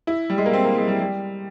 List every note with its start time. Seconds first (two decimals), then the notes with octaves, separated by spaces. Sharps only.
0.07 E4
0.30 G3
0.38 G#3
0.46 A#3
0.53 C4
0.65 A#3
0.77 G#3
0.88 G3
1.00 G3